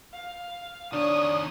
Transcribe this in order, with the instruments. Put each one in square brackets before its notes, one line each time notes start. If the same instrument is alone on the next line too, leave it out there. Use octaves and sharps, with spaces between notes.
[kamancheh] F5
[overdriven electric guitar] D#3 C#5 [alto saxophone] D4 [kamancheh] D#6